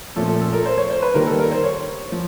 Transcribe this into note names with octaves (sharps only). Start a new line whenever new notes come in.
A#2 F3 A3 C#4 A4
A4
A4
A#4
C5
C#5
C5
B4
D#3 G3 A#3 A#4
A4
A#4
C5
C#5
F3